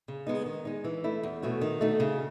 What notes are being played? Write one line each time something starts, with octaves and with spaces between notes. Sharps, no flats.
C#3
G#3 B3 D#4
D#3
G#3 D#4
E3
A3 E4
E2
B2 A3 C#4 F#4
D#3
A3 D#4 F#4
C#3